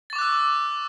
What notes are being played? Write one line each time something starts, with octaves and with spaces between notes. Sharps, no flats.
C#6 D6 E6 F#6 A6